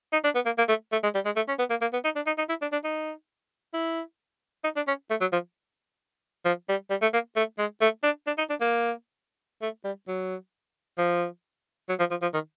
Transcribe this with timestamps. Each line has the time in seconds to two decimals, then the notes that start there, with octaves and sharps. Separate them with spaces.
0.13 D#4
0.24 D4
0.35 B3
0.46 A#3
0.58 A#3
0.69 A3
0.92 A3
1.03 G#3
1.15 G3
1.25 G#3
1.36 A3
1.49 C#4
1.59 B3
1.70 A#3
1.81 A#3
1.93 B3
2.05 D#4
2.16 D4
2.27 D#4
2.38 D#4
2.49 E4
2.62 D4
2.72 D4
2.84 D#4
3.74 E4
4.64 D#4
4.76 D4
4.88 C#4
5.11 A3
5.21 F#3
5.33 F3
6.45 F3
6.69 G3
6.90 G3
7.02 A3
7.14 A#3
7.36 A3
7.59 G#3
7.81 A3
8.03 D4
8.27 D4
8.38 D#4
8.50 D4
8.61 A#3
9.62 A3
9.85 G3
10.08 F#3
10.98 F3
11.89 F#3
11.99 F3
12.11 F3
12.22 F3
12.34 D#3